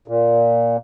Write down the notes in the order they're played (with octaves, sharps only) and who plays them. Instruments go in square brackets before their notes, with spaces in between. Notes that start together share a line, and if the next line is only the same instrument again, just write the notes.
[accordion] A#2